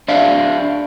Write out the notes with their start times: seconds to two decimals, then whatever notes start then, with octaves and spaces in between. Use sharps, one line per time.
0.08 D4 E5 F5